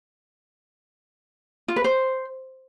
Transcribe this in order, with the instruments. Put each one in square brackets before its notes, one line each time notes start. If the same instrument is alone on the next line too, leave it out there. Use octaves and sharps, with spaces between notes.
[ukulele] F4
B4
C5